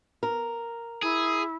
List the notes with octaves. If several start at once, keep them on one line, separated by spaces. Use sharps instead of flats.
A#4
E4 G#4